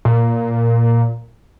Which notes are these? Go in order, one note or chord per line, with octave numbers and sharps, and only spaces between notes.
A#2